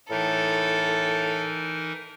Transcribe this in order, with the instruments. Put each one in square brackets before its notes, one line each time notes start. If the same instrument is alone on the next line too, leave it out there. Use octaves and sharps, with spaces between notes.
[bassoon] A2 [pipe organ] E3 D#4 A#4 [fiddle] A4